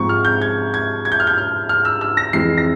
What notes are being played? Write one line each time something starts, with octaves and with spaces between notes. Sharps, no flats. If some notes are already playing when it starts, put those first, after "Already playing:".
Already playing: G#2 F3 G#3 C4 C#6
F6
G6
G#6
G#6
G#6
G6
F6
G6
F6
F6
E6
E6
A#6
F2 E3 G#3 C4 C7
A#6